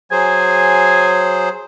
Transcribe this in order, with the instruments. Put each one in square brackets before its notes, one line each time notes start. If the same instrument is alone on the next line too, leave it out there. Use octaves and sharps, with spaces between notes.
[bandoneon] F#3 G#4 C5 [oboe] G#5